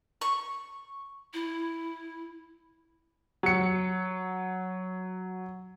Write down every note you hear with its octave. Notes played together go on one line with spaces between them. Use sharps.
C#6
E4
F#3 C#7